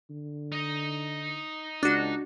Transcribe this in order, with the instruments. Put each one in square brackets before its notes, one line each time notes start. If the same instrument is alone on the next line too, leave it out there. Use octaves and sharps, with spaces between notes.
[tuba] D3
[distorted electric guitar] D#4 D#5
[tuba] C#2 [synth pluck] D4 F#4